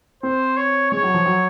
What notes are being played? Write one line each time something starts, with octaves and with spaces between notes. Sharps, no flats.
C4 C5
C#5
G#3 C#5
F#3
F3
F#3